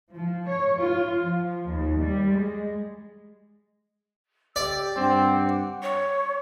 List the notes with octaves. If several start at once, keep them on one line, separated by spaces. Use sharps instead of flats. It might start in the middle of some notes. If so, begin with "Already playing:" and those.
F3
C#5
F4
F3
D#2
G3
G#3
G4 D5 E6
G2 C4 F#5 G5 D6
C#5